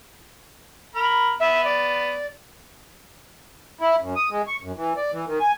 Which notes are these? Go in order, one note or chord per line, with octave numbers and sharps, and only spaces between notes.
A#4 B5
B3 E5
D5
E4
F#2
D#6
G#3
C#6
F#2
E3
D5
E3
D#3
G#5